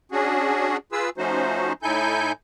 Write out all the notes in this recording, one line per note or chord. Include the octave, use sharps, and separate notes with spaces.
C#4 D4 F#4 G#4
F4 G#4 B4 E6
F3 A3 C#4 D#4 F#4 C5
A2 D#4 E4 A4 G#5 G6